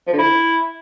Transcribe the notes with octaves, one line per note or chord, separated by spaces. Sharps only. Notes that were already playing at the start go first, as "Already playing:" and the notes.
F3
D3
E4